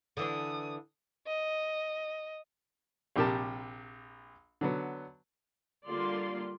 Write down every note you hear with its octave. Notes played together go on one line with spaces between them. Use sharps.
D3 E3 D4 D#6
D#5
A#1 C3 G4 A#4 A5
D3 F#3 B3
D3 G3 A#3 F4 D5 C6